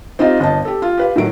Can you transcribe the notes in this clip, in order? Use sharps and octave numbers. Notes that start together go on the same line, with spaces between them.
C4 D#4 F4 G4 D#5
G1 D#5 A5
G4 A4
F4
G4 B4 F5
A2 D#3 F#3 D7